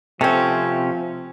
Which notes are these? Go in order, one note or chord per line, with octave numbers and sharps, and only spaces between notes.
C3 F3 A3 C4 C#4